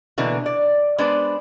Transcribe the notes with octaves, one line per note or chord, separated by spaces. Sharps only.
B2 D3 E3 A#3
D5
G#3 B3 D4 B4 C5 D5